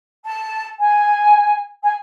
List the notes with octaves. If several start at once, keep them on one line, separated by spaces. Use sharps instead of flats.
A5
G#5
G#5